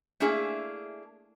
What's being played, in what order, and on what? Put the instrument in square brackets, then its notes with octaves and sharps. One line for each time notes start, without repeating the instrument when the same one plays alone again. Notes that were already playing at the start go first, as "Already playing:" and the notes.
[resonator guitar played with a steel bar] A3 A#3 D4 E4 G#4 E5